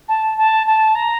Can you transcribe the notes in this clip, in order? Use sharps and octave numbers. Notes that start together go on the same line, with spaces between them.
A5
A5
A5
A#5